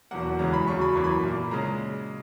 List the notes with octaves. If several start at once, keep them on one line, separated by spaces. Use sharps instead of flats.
E2 B2 F#3 A#3 F#5
F#2 C#3 E3 G#3 A#5
B5
F#2 C#3 F#3 C#6
B5
F#2 E3 A#3 C#6
B5
A#2 A#3
C#3 G#3 A#5